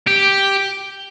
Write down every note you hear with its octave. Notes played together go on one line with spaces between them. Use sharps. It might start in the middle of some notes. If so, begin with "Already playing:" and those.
G4